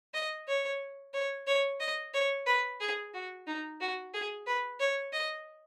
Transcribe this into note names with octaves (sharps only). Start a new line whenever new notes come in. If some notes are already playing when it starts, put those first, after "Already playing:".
D#5
C#5
C#5
C#5
D#5
C#5
B4
G#4
F#4
D#4
F#4
G#4
B4
C#5
D#5